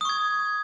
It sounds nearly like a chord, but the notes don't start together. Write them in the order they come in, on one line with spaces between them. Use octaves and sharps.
D#6 C#6 G#6